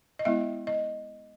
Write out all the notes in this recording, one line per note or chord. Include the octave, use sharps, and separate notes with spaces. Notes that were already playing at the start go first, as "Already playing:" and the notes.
D#5
G#3 B3 E4 E5
D#5